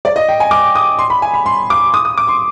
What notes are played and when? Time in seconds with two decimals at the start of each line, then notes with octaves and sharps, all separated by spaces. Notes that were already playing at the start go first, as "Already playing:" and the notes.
0.05 D5
0.16 D#5
0.28 G5
0.40 G#5
0.51 D6
0.75 D#6
0.99 C6
1.10 B5
1.22 G#5
1.34 B5
1.46 C6
1.70 D6
1.94 D#6
2.05 D#6
2.18 D6
2.28 C6